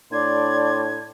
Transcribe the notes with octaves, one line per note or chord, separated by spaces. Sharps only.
A2 D4 D5 C6 D6 G#6